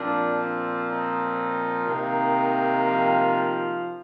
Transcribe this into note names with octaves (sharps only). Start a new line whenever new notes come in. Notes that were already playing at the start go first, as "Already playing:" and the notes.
Already playing: A#2 F3 C4 D4
D4
D#4
C3 D#3 A#3
F3 F4